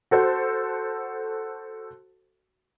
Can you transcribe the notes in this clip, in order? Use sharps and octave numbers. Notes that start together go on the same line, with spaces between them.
F#4 A4 C5